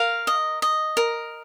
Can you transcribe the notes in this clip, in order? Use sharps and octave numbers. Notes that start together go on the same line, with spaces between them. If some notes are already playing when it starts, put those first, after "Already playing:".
Already playing: A#4 F5
D#5
D#5
A#4